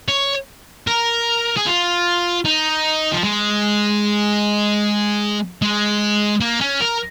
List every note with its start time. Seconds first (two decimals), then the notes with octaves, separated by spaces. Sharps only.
0.08 C#5
0.87 A#4
1.57 G#4
1.67 F4
2.45 D#4
3.13 F3
3.24 G#3
5.62 G#3
6.41 A#3
6.61 C#4
6.81 A#4